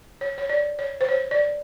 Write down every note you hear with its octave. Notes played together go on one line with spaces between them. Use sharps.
C#5
C#5
D5
C#5
C5
C#5
D5